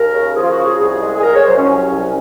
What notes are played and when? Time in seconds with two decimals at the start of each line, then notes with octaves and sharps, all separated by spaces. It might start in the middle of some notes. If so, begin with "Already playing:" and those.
Already playing: D#2 A#4
0.13 C#3
0.35 F3 G#4
0.43 F4
0.50 F#4
0.57 C#3
0.64 G#4
0.79 C2 G#4
1.02 G#3
1.18 G#4
1.23 C2 A#4
1.35 C#5
1.46 F#3 C5
1.57 C#4
1.68 C2 C#4
1.90 C2